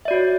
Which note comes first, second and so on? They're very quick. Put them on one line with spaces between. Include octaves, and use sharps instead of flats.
E5 D5 F#4 C#5